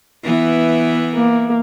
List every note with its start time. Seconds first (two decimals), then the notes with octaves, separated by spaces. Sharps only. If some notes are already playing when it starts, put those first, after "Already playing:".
0.24 E3 B3 E4
1.15 A#3